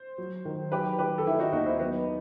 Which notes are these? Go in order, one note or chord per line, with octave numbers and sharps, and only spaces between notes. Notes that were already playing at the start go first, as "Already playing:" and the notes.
Already playing: C5
F#3
D#3
F#3 G4 B4
D#3 G4 B4
A4
D#3 E4 G4
D#4 F#4
D#2 D#4 F#4
C4 E4
F#3 B3 D#4